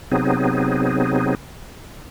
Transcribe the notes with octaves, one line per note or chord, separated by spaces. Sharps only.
C3 F#3 B3 C4 D#4 G#4